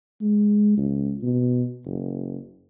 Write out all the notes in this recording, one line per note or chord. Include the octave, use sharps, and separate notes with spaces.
G#3
C#2
B2
F#1